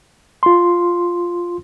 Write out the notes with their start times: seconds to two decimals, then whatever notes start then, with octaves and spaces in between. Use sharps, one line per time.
0.43 F4 C6